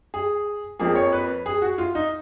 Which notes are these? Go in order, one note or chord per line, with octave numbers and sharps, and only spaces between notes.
G#4
F2 F3 A#3 G#4
C#5
B4
G#4
F#4
F4
D#4